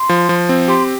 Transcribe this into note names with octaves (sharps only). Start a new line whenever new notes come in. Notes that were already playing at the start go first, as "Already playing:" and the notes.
Already playing: C6
F3
F3
C4
G4 C6